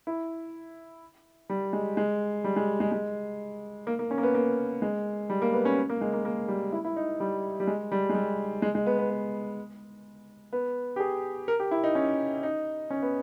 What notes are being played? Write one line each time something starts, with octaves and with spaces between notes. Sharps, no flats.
E4
G3
G#3
G#3
G3
G#3
G#3
G#3
A#3
A#3
C#4
A#3
B3
A#3
G#3
G3
A#3
B3
C#4
A#3
G#3
A#3
A#3
G3
E4
E4
D#4
G3
G3
G#3
G3
G#3
G3
G#3
G#3
B3
B3
B3
B3
G4
G#4
A#4
G4
E4
D#4
C#4
D#4
C#4
B3